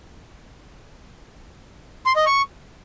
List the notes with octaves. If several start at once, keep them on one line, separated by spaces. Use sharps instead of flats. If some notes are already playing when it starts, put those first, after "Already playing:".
C6
D#5
C#6